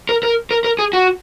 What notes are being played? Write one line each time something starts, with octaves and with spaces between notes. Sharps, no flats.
A#4
A#4
A#4
A#4
G#4
F#4